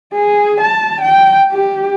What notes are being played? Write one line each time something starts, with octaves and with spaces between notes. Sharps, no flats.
G#4
A5
G5
G4